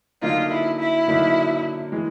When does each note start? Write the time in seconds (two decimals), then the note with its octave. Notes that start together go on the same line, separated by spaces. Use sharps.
0.22 D3 F#3 A#3 D#4 F4
0.51 E4
0.79 E4
1.07 D3 F#3 A#3 D#4
1.92 E3 G#3